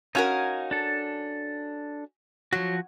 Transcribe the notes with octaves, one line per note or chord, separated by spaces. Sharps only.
C#4 D#4 F#4 A#4 F5 G#5
D4 A4
F3 F#3 F#4